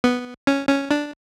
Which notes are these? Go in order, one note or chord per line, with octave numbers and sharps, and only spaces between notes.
B3
C#4
C#4
D4